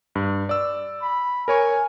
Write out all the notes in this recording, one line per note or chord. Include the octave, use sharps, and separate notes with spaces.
G2
D5 E6
B5
A#4 C#5 G#5 C#6